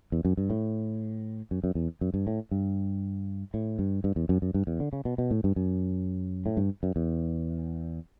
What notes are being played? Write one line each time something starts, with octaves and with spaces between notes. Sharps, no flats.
E2
F#2
G2
A2
F#2
F#2
E2
F#2
G2
A2
G2
A2
G2
G2
E2
F#2
F#2
G2
E2
D3
C#3
B2
B2
A2
G2
F#2
A2
G2
F#2
E2